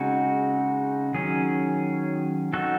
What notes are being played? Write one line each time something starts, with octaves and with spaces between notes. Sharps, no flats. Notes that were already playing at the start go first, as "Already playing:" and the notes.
Already playing: C#3 G#3 C4 D#4 F#4
D#3 F#3 C#4 G#4
F#3 C4 D#4 F#4 A4